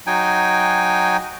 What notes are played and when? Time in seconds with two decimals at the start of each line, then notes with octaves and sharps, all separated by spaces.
0.07 F#3 D#4 G5 G#5